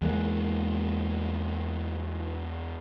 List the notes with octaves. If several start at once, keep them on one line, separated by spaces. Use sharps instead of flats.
E2 G#3 A#3